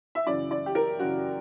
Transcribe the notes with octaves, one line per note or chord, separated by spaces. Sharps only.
E5
F#2 C#3 E3 D5
D5
G4
A#4
F#2 C#3 E3 F#4